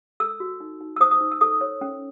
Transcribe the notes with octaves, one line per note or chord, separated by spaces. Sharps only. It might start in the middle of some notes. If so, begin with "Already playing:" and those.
A4 E6
F#4
D#4
D#4
E6
C5 D#6
D#6
D#4
E6
A4 D#6
C#5
C#4